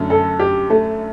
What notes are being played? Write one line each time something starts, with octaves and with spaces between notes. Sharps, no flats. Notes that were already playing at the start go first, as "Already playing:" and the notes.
Already playing: F#2 D3 A3
A4
G4
A3